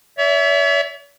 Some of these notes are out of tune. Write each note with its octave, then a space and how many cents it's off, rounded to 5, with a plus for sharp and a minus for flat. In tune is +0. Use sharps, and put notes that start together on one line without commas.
C#5 +45 E5 +0